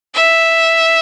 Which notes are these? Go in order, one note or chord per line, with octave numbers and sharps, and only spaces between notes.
E5